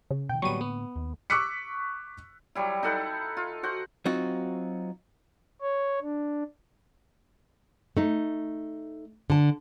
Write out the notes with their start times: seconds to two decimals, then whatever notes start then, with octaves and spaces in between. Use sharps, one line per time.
0.11 C#3
0.29 B2 D#3 G5
0.42 A2 D3 F#3 G3 A#3 B3 C#6 D#7
0.61 B3
0.96 D#2
1.30 C#6 D6 E6 F#6 B6 C#7
2.55 F#3 G3 E4
2.83 D#4 E4 A4 F#5
3.37 F4
3.63 F#4 C5 F#5
4.05 F#3 C4 D#4 F4 F#4
5.61 C#5
6.02 D4
7.97 A3 D#4
9.30 D3 A5